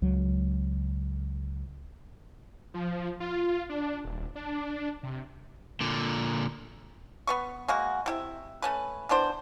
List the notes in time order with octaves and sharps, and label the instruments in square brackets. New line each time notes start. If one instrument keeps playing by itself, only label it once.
[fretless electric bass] C#2 F#3
[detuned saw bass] F3
F4
D4
D#1
D4
C3
[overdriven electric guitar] A#2 D3
[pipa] B3 B4 C#6
G#3 A#3 F#4
C3 E4 E5
A3 C#4 B4
E3 B3 D4 C5